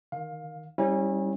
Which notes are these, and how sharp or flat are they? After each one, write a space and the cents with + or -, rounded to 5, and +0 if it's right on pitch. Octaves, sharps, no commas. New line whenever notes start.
D#3 +0 F5 +20
G3 +0 C#4 -30 E4 -40